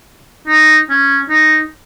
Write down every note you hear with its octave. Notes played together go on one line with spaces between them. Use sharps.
D#4
C#4
D#4